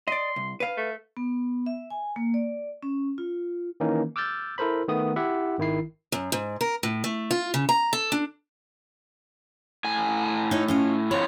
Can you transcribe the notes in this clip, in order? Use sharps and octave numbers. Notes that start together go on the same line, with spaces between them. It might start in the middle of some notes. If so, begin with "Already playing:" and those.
D5 D#5 C6
C2
B4 F5
A3
B3
E5
G#5
A#3
D5
C#4
F4
D#3 E3 A#3 C#4 D#4
D6 E6 F6 G6 A6
E4 A4 A#4 C5 B5
D#3 A3 B3 D#6
E4 G4 E5 F#5
G#1 D#3 E4 C7
F#2
G#2
A#4
A2
A3
F4
C#3
A#5
A4
D4
A2 G#5
D#4 E4 C#5
C#4 F4 D#5
F3 C4 E4 C#5